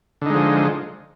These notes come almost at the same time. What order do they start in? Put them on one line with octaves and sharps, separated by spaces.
D3 D#4 G#3 F3